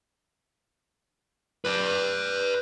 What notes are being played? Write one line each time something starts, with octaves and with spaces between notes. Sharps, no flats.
B4 D5